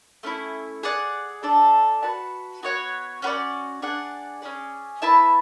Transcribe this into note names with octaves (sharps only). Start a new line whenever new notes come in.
A3 C#4 E4
G#4 D5 F#5
A3 D4 A4 D5
F#4 B4 F#5 A5
B3 F#4 C#5 F#5
C#4 F#4 B4 D5
D4 G#4 D5 F#5
C#4 G#4 D5
E4 B4 E5 A5